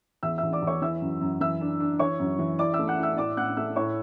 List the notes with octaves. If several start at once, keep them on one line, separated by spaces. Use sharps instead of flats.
E2 E5 E6
E2 E5 E6
D5 D6
E2
C#5 C#6
E3 E5 E6
F#2
F#2
E3 E5 E6
D4
D4
E3 C#5 C#6
F#2
E3
E4 D5 D6
E5 E6
A3
F#5 F#6
E4 E5 E6
A2 D5 D6
A2 F#5 F#6
A3 E5 E6
A2 C#5 C#6